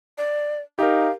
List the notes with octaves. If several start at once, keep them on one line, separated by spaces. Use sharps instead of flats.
D5
D#4 G4 A#4 F5